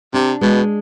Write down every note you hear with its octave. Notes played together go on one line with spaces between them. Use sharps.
C3 D4
B2 G#3